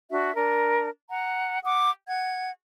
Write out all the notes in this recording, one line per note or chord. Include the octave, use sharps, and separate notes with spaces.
D4 F#4 E5
D4 A#4
F#5 A#5
F#5 D6 D#6
F#5 G#6